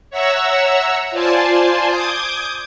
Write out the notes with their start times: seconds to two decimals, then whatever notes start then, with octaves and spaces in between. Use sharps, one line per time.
0.10 C#5 E5 F#5 A#5 C#6 E6
1.11 F4 C5 D5 G#5 A5 C6
1.87 D6 D#6 G6 G#6